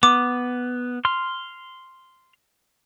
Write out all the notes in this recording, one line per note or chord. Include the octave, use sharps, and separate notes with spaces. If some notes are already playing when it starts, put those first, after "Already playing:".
B3 D6
C6 F6